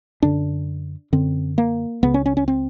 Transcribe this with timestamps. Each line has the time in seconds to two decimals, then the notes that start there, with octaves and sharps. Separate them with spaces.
0.23 F#2 D3 D4
1.13 F#2 D3 C4
1.58 A#3
2.03 C#2 C#3 B3
2.14 C#4
2.26 C#4
2.37 C#4
2.48 C4